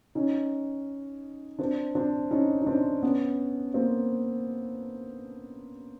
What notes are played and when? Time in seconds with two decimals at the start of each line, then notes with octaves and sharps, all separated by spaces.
0.15 C#4 D#4
1.59 C4 D4
1.95 C4 D4
2.31 C#4 D#4
2.62 D#4
2.66 C4 D4
3.02 B3 C#4
3.74 A#3 C4